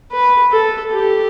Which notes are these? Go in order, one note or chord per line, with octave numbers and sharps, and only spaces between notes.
B4
A4
G4